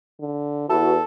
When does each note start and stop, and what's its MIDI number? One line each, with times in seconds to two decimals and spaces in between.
0.20 0.69 50
0.69 1.00 40
0.69 0.93 64
0.69 0.93 66
0.69 1.04 69
0.69 0.93 71